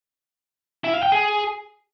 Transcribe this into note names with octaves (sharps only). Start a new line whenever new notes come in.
E4
F5
G5
G#4